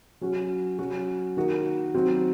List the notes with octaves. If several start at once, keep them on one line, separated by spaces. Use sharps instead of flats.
F#3 C#4 F#4
F#3 C#4 F#4
D#3 A#3 D#4 F#4
F#3 C4 D#4 F#4